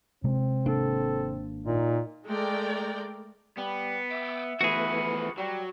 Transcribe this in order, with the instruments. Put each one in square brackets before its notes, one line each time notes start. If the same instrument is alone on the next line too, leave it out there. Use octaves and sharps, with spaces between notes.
[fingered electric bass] C3 G#3 [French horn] C4
[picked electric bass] G#1 A#3 D4 [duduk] A4
[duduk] A#2 [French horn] D#4
[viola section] G#3 A3 A#4 D5 G5
[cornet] G3 [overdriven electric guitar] B3
[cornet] E5 [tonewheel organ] G5 D6 E6
[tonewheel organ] E3 A3 B3 [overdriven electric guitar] F3 B4 [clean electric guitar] F#4 G#4
[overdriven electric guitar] F#3 [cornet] G3